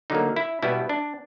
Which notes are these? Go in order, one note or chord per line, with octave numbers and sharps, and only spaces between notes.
D3 F#3 A#3 D#4
E4
B2 G3 B3 E4
D4